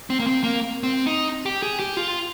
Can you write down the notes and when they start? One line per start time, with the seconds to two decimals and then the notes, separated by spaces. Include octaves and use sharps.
0.10 C4
0.20 A#3
0.27 C4
0.43 A#3
0.83 C4
1.06 D#4
1.46 G4
1.63 G#4
1.80 G4
1.97 F4